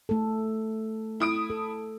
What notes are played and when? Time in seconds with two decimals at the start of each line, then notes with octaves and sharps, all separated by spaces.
0.09 A3 A4
1.20 E4 D#6 D7
1.50 A4